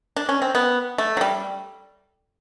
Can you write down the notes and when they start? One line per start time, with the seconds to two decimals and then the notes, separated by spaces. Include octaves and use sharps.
0.16 D4
0.29 C#4
0.42 C4
0.55 B3
0.98 A3
1.17 F#3
1.21 G3